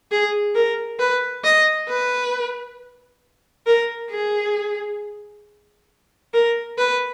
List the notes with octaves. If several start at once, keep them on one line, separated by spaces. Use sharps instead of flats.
G#4
A#4
B4
D#5
B4
A#4
G#4
A#4
B4